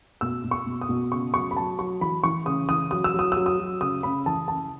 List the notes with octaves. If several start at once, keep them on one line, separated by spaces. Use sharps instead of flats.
B2 E6
B2
C#6
B2
D#6
B2
C#3 C#6
F#3 C#6
B5
F#3 A5
F#3 C#6
E3 B5
E3 C#6
C#3 D#6
E3 D#6
F#3 D#6
E6
F#3 D#6
F#3 E6
D#6
F#3
C#3 D#6
C#3 B5
E3 A5
C#3 A5